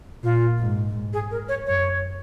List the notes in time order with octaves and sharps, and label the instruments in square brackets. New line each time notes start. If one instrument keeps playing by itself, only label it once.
[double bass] A#2 [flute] F4
[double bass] G#2
[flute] G#4
A#4
C#5
[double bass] F#2 [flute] C#5